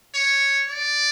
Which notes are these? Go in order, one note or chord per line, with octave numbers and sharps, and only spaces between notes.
C#5
D5